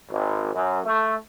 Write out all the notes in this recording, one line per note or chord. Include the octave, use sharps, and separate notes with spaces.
G#1
F#2
A3